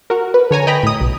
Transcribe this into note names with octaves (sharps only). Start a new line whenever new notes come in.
F#4 A#4
B4
D3 C#5 G#5 A#5
D#5 G5 A#5 B5
A2 D#6
B1